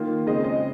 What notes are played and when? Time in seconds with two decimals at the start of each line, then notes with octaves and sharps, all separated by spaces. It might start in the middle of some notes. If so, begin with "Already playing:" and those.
Already playing: D#3 A#3 F4
0.27 C#3 G#3 C4 D#5
0.44 D#5